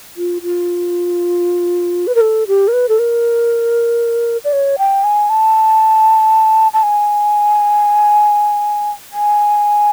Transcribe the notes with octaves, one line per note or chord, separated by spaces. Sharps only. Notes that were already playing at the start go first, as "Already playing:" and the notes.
F4
F4
B4
A#4
A4
G4
A#4
B4
A4
A#4
D5
C#5
G5
G#5
A5
A5
G#5
G#5